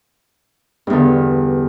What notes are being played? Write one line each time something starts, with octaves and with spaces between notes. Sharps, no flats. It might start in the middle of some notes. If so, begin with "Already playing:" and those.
E2 G2 D3